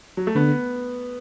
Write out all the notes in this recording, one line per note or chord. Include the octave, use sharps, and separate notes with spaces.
F#3
A3
D3 B3